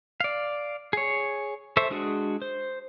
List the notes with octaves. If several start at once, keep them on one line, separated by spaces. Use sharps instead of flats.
D5 F5
G#4 C#5
A4 C5 E5 C#6
G#3 D4 F#4 G#4
C5